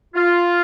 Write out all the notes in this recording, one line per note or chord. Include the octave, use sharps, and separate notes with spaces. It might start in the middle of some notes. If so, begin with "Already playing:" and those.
F4